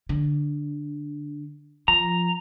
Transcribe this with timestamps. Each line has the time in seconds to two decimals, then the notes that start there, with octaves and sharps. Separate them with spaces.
0.09 D3
1.88 F3 A#5